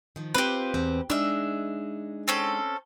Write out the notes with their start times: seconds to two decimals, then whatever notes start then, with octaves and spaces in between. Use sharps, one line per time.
0.16 D#3 F3
0.35 C4 F4 G4 B4 C5
0.74 E2 C4
1.10 G#3 D4 D#4 E5 E6
2.28 C4 C#4 A4